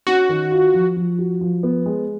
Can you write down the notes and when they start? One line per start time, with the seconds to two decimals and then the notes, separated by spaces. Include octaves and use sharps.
0.07 C#4 F#4
0.29 D#3
0.52 F4
0.74 F3
0.97 F3
1.18 F#4
1.41 F3
1.63 B3
1.86 G#3